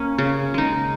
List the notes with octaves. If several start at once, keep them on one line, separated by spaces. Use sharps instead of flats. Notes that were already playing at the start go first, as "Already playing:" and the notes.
Already playing: A#3 C#4
C#3
G#3 D#4